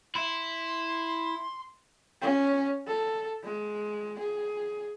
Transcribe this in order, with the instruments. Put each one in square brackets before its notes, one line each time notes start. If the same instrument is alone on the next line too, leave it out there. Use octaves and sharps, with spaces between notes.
[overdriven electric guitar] E4 [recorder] C6
[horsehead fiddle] C#4
A4
G#3
G#4